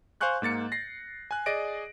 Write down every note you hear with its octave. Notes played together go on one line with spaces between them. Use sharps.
C5 F5 G#5 C#6 F#6 G6
G#2 A#3 A6 C#7
A#6 C7
G#5 F#6
G#4 D5 D#5 A#6 D7